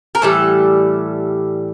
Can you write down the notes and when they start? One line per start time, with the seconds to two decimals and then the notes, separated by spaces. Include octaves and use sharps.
0.15 A#4
0.22 A2 E3 G3 A4